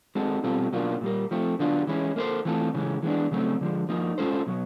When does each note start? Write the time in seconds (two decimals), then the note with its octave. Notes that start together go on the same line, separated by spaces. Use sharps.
0.15 G#3 C4 D#4 F#4 A4
0.44 B2 G3 C4 F4 A4
0.73 B2 F#3 A#3 D4 F4
1.01 A#2 G3 A#3
1.31 F3 A3 C4
1.59 D3 F#3 B3 D4 F4
1.87 E3 G#3 C#4 E4
2.16 A#3 C#4 E4 A4 C5
2.45 E3 A3 C4 F4 A4
2.74 C#3 E3 G#3
3.03 E3 G#3 B3 D4
3.31 C#3 F#3 A3 C4
3.61 D3 F3 G#3
3.89 F3 A#3 D#4
4.18 G#3 C#4 F4 A4 C5
4.47 B2 F#3 B3